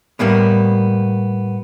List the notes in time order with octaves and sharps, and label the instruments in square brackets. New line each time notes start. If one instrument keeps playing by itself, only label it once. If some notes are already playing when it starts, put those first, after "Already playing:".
[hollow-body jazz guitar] A2 G3 A#3 B3